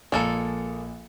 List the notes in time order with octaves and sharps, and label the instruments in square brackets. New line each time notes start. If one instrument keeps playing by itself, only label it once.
[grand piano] A#1 A6 C#7 [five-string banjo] G#3 A#3 A4